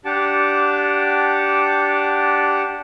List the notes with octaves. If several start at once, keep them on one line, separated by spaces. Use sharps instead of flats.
D4 G4 F#5 A5 D6